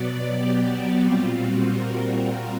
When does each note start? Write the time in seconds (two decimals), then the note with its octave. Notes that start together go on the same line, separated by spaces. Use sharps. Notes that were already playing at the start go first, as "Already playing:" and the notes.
Already playing: B2 F#3 B3 D5
0.36 G4
0.70 F#4
1.03 A#2 G3 C4 F4
1.37 F#4
1.71 A#4